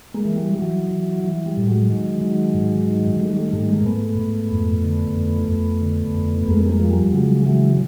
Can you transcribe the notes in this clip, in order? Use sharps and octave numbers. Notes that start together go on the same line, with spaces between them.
G#3 A#3
E3
G3
G3
E3 F#3
E3
E3
G3
A2
F#3 G#3
D#3
D#3
G#2
D#3
D#3 G3 A3
G3 A3
G#2 G3 A3
G#3 A#3
G#2 A3 B3
G#2
F2
D3
F2
F2
D3
F2
F2 G#3 A#3
G#3 A#3
F3
G3
C#3 F#3 G#3
E3 F#3 G#3